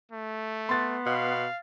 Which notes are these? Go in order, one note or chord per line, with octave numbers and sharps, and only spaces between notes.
A3
B3 C6 A6
B2 F5